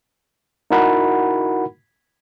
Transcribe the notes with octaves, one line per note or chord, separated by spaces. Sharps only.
D#4 E4 F#4 A#4 F#5 B5